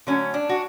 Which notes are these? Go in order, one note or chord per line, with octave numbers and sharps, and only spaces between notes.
D3 F#3 A3 C#4
D4
F#4